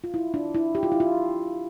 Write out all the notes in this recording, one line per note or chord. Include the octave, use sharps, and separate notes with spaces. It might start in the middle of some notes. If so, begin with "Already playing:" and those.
F4
E4
D4
E4
G4
F4
E4
F4